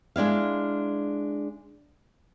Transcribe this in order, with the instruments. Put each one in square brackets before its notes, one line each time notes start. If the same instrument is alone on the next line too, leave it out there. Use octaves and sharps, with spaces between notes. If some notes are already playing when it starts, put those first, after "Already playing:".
[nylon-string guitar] G#3 D4 E4 F5